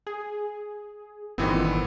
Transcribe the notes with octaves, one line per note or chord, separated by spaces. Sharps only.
G#4
G1 A#2 D#3 E3 B3 C4